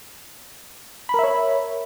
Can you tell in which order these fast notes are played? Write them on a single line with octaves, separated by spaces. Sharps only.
B5 A#4 E5 C#5